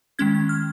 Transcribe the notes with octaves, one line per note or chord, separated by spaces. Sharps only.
D#3 G#3 C#4 G#6
G#6
F6